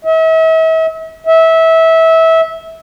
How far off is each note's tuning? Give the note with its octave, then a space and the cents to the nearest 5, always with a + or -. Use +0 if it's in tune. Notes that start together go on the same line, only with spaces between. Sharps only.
E5 -40
E5 -20